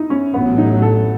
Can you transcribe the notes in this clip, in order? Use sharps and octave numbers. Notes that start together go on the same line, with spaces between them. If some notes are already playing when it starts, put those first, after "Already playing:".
Already playing: D#4 E4
C#4
A1 A2 F#3 A3 B3
D#4
A4